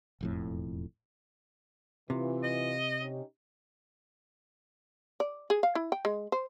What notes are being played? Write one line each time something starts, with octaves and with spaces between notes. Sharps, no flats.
E1 F2 A2
C3 E3 F4
D#5
C#4 D#4 G4
D5
G#4
F5
E4
G5
G#3
C5